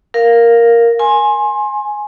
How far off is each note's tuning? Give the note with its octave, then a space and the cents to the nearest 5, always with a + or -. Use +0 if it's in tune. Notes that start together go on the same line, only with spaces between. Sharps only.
A#4 +0 F5 +0
G#5 +5 C6 +30